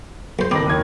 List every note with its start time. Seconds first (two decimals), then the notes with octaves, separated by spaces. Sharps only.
0.39 B1 C5
0.51 F#1 D#3 C4 B5 D6 A#6
0.67 D#2 G#6 D#7